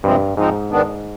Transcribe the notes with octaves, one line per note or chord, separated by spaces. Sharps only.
G2 C3 F3 G#3 C4
G#2 F3 G#3 C4 D#4
D#3 B3 D4